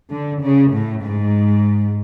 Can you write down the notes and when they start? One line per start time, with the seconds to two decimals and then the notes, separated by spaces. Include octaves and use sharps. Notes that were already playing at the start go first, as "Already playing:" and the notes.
0.10 D3
0.41 C#3
0.72 A2
1.04 G#2